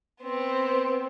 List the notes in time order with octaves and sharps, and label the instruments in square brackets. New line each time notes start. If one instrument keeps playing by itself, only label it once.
[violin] B3 C4